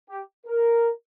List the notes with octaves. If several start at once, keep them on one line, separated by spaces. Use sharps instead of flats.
G4
A#4